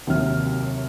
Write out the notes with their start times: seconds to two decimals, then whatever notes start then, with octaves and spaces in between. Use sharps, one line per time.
0.07 D#2 C3 F#3 F6